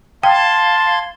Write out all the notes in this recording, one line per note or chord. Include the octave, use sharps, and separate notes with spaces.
F5 G5 A5 C6 G#6